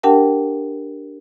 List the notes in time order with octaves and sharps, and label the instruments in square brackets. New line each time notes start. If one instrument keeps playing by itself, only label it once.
[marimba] D4 G4 A#4 F#5 G5 A5